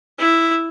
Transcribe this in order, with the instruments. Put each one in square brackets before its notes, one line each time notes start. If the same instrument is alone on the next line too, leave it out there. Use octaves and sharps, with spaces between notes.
[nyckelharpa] E4